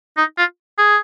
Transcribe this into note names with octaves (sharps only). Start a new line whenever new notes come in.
D#4
F4
G#4